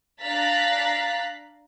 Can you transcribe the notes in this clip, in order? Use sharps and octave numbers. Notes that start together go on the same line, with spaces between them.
D4 F5 A#5 F#6 A6 B6